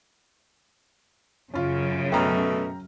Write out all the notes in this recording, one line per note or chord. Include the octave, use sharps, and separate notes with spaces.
F#2 C#3 C#4 F4
B2 A3 G5 A#5 F6